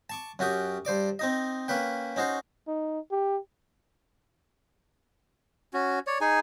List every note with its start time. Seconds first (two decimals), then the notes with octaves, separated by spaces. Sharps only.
0.10 A5 C#6 D6
0.39 F#2 C#4 F#4 G4 G5 D#6
0.85 G2 C5 D5 D6
1.19 C4 D#4 D#5
1.68 A#3 C#4 B4 G5
2.16 C#4 D#4 F#4 C5
2.67 D#4
3.11 G4
5.74 C#4 F#4
6.07 C#5 D5
6.21 D#4 G#4 G#5